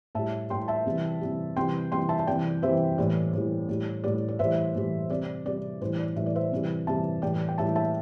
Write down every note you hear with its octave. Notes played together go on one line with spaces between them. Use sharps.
A2 G3 E5 A5
A2 G3 G5 C6
E5 A5
C3 E3 G3
C3 E3 G3
C3 E3 G3 G5 C6
C3 E3 G3 G5 C6
E5 A5
A5
C3 E3 G3 D5 G5
C3 E3 G3 C5 E5
A2 E3 G3 D5
A2 E3 G3
A2 G3
A2 G3 D5
D5
A2 E3 G3 C5 E5
A2 E3 G3
C3 G3 D5
C3 G3 D5
A2 E3 G3 C5
D5
A2 E3 G3 E5
D5
C5 E5
C3 E3 G3
C3 E3 G3 E5 A5
A2 E3 G3 D5 G5
G5
A2 E3 G3 E5 A5
E5 A5